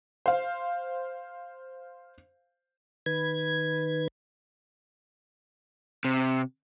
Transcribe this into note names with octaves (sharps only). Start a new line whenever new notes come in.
C5 F5
D#3 B4 G#6
C3